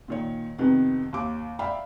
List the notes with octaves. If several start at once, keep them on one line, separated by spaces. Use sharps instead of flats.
A#2 D#3 C#5
F2 C3 D#3 B3
D#2 D6
D5 E5 F5 G5 B5